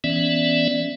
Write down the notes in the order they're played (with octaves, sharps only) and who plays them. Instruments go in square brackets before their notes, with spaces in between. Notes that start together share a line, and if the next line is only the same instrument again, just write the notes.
[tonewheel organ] E3 B3 C#4 D5 E5